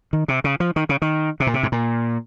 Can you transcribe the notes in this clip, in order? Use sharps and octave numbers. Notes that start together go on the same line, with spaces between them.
D#3
C3
C#3
F3
D#3
C#3
D#3
C3
A#2
C3
G#2
A#2